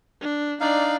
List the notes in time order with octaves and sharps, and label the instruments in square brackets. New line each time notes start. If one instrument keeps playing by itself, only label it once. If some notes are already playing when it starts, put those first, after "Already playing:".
[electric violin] D4
[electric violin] D4 D5 [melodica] D#4 F5